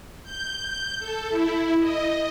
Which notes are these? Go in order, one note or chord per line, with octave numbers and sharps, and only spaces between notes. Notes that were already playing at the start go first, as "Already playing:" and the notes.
G6
A4
E4
D#5